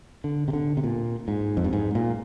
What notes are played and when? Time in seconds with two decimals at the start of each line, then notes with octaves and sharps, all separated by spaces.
0.24 D3
0.48 C3
0.53 D3
0.77 C3
0.84 A#2
1.28 G#2
1.57 F2
1.64 G2
1.73 G#2
1.95 A#2